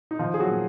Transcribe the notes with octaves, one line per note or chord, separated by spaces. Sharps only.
D#4
D#3 F3 F4
G#4
F#3 F#4
A#3